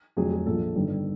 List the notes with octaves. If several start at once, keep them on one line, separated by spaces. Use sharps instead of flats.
F1 F2 D3 F#3 G#4
G#4
A#1 A#2 F3 A4
G1 G2 D#3 G3